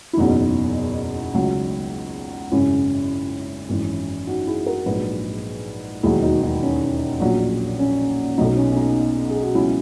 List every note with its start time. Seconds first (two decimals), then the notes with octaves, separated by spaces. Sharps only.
0.13 E4
0.17 F#1 E2 B2 F#3 D#4
1.34 C#2 C#3 F#3
2.52 G#1 F#2 C#3 C#4 E4
3.69 G#1 F#2 E3
4.27 D#4 F#4
4.47 E4 G#4
4.66 F#4 A#4
4.86 A#1 G#2 F#3 G#4 B4
6.03 E1 D#2 D#3 F#3 E4 G#4
6.22 D#4 F#4
6.42 D#4
6.62 C#4
7.20 A#1 A#2 F#3
7.79 C#4
8.38 B1 B2 F#3 D#4
8.57 C#4
8.72 C#4
8.76 D#4
9.30 G#4
9.42 F#4
9.55 C#2 B2 F#3 C#4 E4